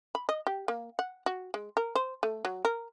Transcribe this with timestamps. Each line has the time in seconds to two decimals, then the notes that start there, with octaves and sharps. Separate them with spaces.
0.15 B5
0.29 D#5
0.47 G4
0.68 A#3
0.99 F#5
1.26 F#4
1.54 G#3
1.77 A#4
1.95 C5
2.23 A3
2.45 F#3
2.65 A#4